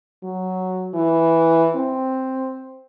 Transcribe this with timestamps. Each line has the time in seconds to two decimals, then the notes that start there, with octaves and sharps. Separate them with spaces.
0.24 F#3
0.94 E3
1.76 C4